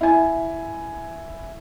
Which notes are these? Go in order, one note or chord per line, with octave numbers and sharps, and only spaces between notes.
E4 G#5